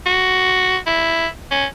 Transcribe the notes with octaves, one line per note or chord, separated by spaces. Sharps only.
F#4
E4
C#4